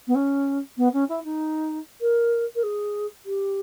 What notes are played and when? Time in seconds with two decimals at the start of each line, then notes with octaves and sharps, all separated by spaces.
0.07 B3
0.15 C#4
0.77 B3
0.93 C#4
1.09 E4
1.24 D#4
2.01 A#4
2.55 A#4
2.63 G#4
3.25 G4